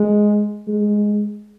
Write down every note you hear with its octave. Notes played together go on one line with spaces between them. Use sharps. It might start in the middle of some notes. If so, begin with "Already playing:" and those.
Already playing: G#3
G#3